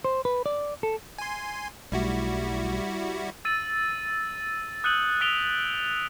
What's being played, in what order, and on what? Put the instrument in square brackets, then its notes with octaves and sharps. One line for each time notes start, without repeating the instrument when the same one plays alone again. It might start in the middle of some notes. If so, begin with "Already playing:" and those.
[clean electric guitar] C5
B4
D5
A4
[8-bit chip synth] G#5 C6
[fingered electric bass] B1 A3 [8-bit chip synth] G3 E4 F#4
[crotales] E6 A6 D#7
D#6 F#6 G6 C#7 D#7 F#7
D#6 B6 D7 F7 G7